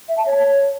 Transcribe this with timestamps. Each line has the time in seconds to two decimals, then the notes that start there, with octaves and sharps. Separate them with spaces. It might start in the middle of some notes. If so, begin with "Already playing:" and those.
0.09 E5
0.18 A5
0.26 C#5